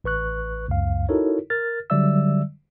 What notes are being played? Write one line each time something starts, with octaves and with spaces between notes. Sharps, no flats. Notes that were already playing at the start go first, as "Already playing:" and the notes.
A1 B4 C#6 F#6
C#2 F#2 F5
D#4 E4 F#4 A4 A#4 C#5
A#4 F6 A6
D3 F#3 G3 D5 E5 E6